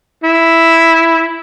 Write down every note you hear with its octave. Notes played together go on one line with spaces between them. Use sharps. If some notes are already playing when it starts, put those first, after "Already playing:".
E4